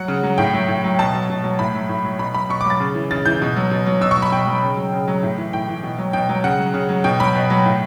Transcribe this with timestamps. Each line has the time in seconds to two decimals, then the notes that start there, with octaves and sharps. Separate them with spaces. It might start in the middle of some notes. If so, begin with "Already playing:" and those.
Already playing: F#3 F#5
0.08 C#3
0.23 F#3
0.38 A2 G5
0.54 F#3
0.68 A2
0.84 F#3
0.99 B2 A5
1.14 F#3
1.30 B2
1.44 F#3
1.59 A2 B5
1.75 F#3
1.89 A2
2.04 F#3
2.19 B2 B5
2.34 F#3 B5
2.50 B2 C#6
2.61 D6
2.65 F#3
2.70 A6
2.80 C#3
2.95 E3
3.11 C#3 A6
3.26 E3 G6
3.42 B2
3.56 F#3
3.71 B2
3.86 F#3
4.01 B2 E6
4.11 C#6
4.17 F#3
4.22 B5
4.32 B2 G5
4.46 F#3
4.63 C#3
4.77 F#3
4.92 C#3
5.08 F#3
5.23 A2
5.38 E3
5.53 A2 G5
5.68 E3
5.83 B2
5.98 F#3
6.13 B2 G5
6.29 F#3
6.44 C#3 F#5
6.59 F#3
6.74 C#3
6.89 F#3
7.04 B2 G5
7.20 F#3 B5
7.35 B2
7.50 F#3
7.66 A2